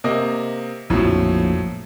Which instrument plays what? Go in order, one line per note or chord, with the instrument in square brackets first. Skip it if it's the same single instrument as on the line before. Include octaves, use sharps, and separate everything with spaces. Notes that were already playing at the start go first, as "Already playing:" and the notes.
[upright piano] C3 A#3 D#5
[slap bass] A#1 F2 [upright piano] A2 F3 F#3